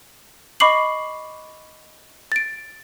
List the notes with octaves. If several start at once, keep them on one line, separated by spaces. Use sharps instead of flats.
D#5 B5 C#6 D6 C7 F#7
A6 D7